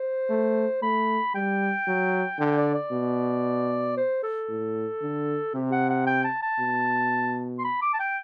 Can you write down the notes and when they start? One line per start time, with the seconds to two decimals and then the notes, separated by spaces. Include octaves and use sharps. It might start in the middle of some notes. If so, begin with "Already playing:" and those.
Already playing: C5
0.30 A3
0.82 A3 B5
1.35 G3 G5
1.87 F#3
2.39 D3 G5
2.57 D5
2.74 D5
2.92 B2
3.97 C5
4.23 A4
4.49 A2
5.02 D3
5.54 C3 G4
5.72 F#5
5.90 F#5
6.07 G5
6.24 A5
6.42 A5
6.59 B2
7.59 C6
7.64 B5
7.82 D6
7.94 A5
7.99 G5